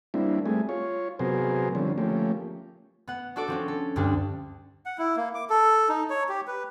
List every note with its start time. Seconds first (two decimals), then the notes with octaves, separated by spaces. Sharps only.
0.14 G3 A#3 C4 D4 E4
0.46 G3 A3 C4 G#4
0.69 F4 C#5
1.19 C3 F#3 B3 G#4 A#4 C5
1.75 D3 F3 G3 C4 C#4
1.98 F3 A3 A#3 C#4 G4
3.07 B3 F#5
3.36 D4 F#4 A4 D5 D6
3.48 F3 C4 C#4
3.68 A4
3.96 D2 G2 G3 D4
4.86 F#5
4.98 E4
5.17 A#3
5.35 D6
5.50 A4
5.89 D#4
6.10 C#5
6.29 G4
6.47 B4